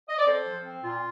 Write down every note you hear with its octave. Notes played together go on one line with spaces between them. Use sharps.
D#5
D5
C4 A4 C5
F3
C4
A#2 F4